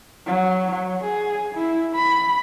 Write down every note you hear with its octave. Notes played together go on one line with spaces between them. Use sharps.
F#3
F#3
G#4
E4
B5